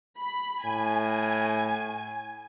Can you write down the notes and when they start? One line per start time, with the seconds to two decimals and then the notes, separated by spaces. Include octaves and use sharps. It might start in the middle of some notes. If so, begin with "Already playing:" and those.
0.20 B5
0.64 A2 G#5